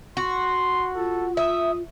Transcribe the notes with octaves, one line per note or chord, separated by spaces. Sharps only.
F#4 C6
F4 A4
E5 D#6